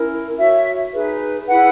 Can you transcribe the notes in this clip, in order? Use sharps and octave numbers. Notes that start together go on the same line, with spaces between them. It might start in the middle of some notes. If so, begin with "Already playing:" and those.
Already playing: C#4 E4 A#4
F#4 C#5 E5
D#4 G#4 B4
E4 G#4 B4 F#5